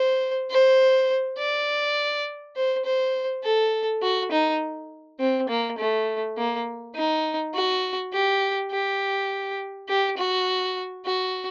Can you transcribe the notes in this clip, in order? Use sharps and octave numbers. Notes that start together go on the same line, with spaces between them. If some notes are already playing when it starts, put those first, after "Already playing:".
Already playing: C5
C5
D5
C5
C5
A4
F#4
D#4
C4
A#3
A3
A#3
D#4
F#4
G4
G4
G4
F#4
F#4